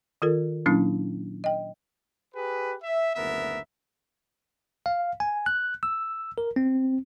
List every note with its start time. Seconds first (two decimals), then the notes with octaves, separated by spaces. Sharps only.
0.22 D#3 F4 A4 A#4
0.66 A#2 F#3 A#3 C#4 D4 E4
1.44 D#5 G5
2.35 G4 G#4 B4
2.83 E5
3.15 F#1 D2 B3 A#4 E5
4.86 F5
5.20 G#5
5.46 F#6
5.83 E6
6.38 A#4
6.56 C4